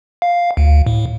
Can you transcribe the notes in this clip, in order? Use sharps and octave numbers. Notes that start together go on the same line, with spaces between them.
F5
D2
A2